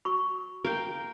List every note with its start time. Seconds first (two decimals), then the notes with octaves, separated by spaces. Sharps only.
0.05 F#4 B5 C#6
0.65 A#4 F5 G5